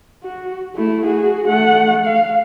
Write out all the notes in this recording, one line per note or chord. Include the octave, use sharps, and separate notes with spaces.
F#4
A3 E4
F#4 G#4
A3 F#5
F5